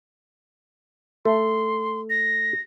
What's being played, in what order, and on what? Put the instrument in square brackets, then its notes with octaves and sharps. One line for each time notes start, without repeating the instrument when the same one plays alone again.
[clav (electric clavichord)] A3 [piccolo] C6
[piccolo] A#6